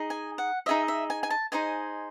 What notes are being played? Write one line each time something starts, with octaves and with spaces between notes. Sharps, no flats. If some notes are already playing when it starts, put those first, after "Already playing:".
Already playing: D#4 G#4 D#5
G#5
F#5
D#4 G#4 D#5 E5
E5
G#5
G#5
A5
D#4 G#4 C5 D#5 G#5